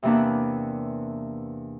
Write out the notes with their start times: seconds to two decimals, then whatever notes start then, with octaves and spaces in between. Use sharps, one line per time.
0.02 E2 C3 E3 A#3 D4 B4